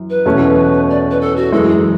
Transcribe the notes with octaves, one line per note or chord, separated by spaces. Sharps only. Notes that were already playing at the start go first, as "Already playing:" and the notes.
Already playing: F#2 E3
B4
E2 B2 A3 C#4
D5
B4
A4
F#4
F#2 E3 G#3 A4
G#4